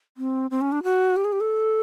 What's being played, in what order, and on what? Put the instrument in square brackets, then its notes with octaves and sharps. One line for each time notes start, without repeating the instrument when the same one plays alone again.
[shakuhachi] C4
C4
C#4
D4
F#4
G4
G#4
G4
A4